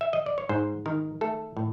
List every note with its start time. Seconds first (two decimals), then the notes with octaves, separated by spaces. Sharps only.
0.01 E5
0.13 D#5
0.26 D5
0.38 C#5
0.49 G#2 C5
0.86 D#3 A#4
1.21 A3 A4
1.57 A2